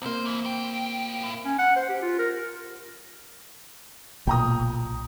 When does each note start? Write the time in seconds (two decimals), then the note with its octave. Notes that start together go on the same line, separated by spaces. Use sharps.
0.02 C2 A#3 C4 C5
0.25 E2 E3
0.45 A2 G5
1.23 A2
1.45 C#4
1.58 F#5
1.76 C5
1.89 G4
2.02 F4
2.18 A#4
4.27 B1 A#2 G5 A#5 D#6